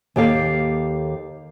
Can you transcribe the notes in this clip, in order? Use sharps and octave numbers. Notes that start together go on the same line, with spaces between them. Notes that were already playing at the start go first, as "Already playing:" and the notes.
D#2 G4 A4 F5